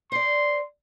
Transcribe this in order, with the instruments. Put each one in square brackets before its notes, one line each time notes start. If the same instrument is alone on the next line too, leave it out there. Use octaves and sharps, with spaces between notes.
[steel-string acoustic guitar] C5 D5 [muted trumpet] C6